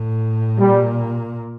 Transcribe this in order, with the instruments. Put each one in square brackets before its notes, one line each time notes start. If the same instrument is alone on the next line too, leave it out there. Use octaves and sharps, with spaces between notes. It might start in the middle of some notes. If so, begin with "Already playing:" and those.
Already playing: [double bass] A2
[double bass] A#2 [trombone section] G3